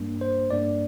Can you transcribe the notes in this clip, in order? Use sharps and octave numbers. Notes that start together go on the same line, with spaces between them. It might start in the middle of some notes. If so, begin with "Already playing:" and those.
Already playing: G2 G3 A#3 D4
C5
G2 G3 A#3 D4 D5